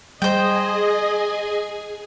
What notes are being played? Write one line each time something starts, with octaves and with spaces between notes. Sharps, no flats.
G3 G#4 C5 D#5 G5 G#5